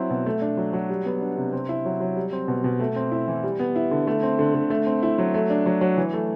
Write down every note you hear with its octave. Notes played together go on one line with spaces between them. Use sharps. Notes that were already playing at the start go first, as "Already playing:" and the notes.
Already playing: F#3 C4 E4
B2
A3
D4
F#3
F#3
G3
B3
D4
C3
C4
E4
F#3
F#3
G3
C4
B2
B2
A3
C4
E4
E3
G3
B3
E4
D3
A3
C4
D3
D3
A3
C4
E4
F#3
A3
D4
F#3
F#3
E3
A3